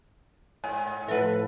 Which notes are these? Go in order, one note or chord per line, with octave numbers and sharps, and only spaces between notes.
G#2 G#5
A2 F3 A4 B4 E5 F#5